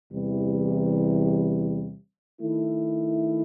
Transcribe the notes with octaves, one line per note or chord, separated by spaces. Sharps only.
E2 C3 E3 G3
D#3 A3 E4